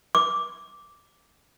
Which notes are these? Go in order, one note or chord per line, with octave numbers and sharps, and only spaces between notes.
D6